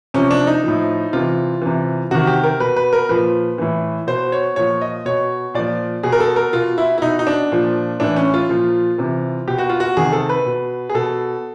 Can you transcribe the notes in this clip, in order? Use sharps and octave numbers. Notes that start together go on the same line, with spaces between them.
C3 F3 C#4
D4
D#4
A2 F3
C3 E3 F4
C3 E3
C3 D#3 F#4
G4
A#4
B2 B4
B4
A#4
A#2 F3 B4
A2 E3
B2 C5
C#5
A#2 F3 C#5
D#5
B2 C#5
A#2 F3 D5
B2 G#4
A#4
A4
A#4
B2 F4
E4
E4
B2 D#4
D#4
D4
A#2 F3
A2 E3 D4
C#4
F4
A#2 F3
C3 E3
B2 G4
F#4
F4
F#4
C3 D#3 G#4
A4
B4
B2
G#4
B2 A4